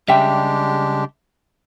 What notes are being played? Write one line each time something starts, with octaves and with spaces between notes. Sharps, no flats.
C#3 G3 G#3 D4 G4 E5 G5